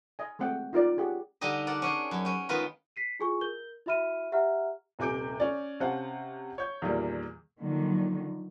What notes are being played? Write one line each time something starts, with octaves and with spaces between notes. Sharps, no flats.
D#5 G#5
G#3 A3 C4 F#5 G5
D#4 F4 A#4 D5
C#4 G4 G#4 F#5
D3 G3 D#4 G4 D#5
A#4 D5 F#5 A5
C#4 D4 G#4
F#2 C#5
C#4 G5
D#3 G#3 B3 F4 A#4 B4
B6 C7 D#7
E4 F4 G#4 G#5 C#6
A#4 G6 G7
E4 F#4 E5 B5 F6 D#7
G4 E5 F#5 A#5 F6
D#1 C3 G#5 D6 G6 D7
C#4 D5
C3 C#4 C5 F5 F#5 A5
C#5 G6
E2 A#2 D#3 G3 A#3
D3 D#3 F3 F#3 A#3